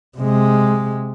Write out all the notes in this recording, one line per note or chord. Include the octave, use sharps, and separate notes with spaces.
C3 G#3